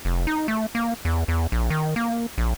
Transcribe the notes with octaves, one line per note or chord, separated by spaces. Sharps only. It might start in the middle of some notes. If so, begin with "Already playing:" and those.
F1
D#4
A3
A#3
E2
E2
A#1
D#3
A#3
A#1